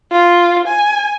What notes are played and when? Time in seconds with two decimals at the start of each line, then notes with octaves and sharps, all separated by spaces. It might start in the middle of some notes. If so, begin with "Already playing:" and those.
0.12 F4
0.68 G#5